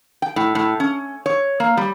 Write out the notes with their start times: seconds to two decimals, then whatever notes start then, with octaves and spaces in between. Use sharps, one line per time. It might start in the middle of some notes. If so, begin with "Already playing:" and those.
0.22 G5
0.36 A2
0.55 A2
0.80 C#4
1.26 C#5
1.60 A#3
1.77 G3